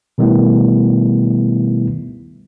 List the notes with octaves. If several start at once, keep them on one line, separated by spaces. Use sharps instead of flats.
B2 D#3 G3 A3 B3 E4